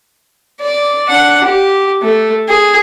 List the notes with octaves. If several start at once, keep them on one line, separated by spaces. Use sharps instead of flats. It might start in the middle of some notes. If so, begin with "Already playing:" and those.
D5
D4 F#5
G4
A3
G#4